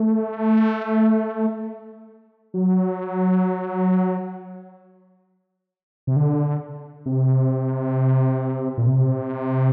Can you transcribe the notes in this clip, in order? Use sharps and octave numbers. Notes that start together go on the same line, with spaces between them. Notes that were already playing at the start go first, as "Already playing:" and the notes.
Already playing: A3
F#3
C3
D3
C3
A#2
C3